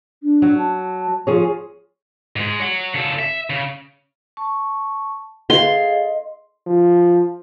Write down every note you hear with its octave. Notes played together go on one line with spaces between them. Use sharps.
D4
F#3
A5
F3 G#4 C#5
G#2 G#3
C#5 F#5
C#3 A4
E5
C#3
A5 C#6
G#4 A4 D#5 F5 C6
F3